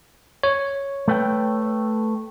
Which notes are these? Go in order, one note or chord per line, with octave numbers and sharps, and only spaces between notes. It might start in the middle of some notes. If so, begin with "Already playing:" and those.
C#5
A3 B4 G5